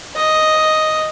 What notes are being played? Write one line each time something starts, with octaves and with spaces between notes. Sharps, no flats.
D#5